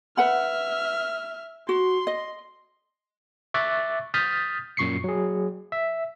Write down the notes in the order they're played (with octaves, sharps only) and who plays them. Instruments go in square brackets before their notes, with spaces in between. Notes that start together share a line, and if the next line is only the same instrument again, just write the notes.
[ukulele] B4 F#5 B5 [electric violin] E5 F6
[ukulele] F#4 [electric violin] C6
[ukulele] D#5
[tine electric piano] E5 C#6 D6 F#6 A6
D#6 F6 G6 A6 B6
F#2 A#2 C#6 C7 C#7
F#3 G#4
E5